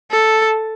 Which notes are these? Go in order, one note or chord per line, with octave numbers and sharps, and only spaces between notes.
A4